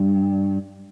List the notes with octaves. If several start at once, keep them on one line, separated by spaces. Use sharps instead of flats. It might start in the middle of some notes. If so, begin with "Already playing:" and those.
Already playing: G2